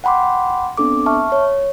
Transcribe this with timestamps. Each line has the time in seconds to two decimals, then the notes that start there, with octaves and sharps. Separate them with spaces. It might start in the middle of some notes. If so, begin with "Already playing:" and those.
0.04 F#5 G5 B5 C6 D6
0.77 B3 C4 D4 A4 D6
1.06 E5 A5 C#6 F6
1.32 C#5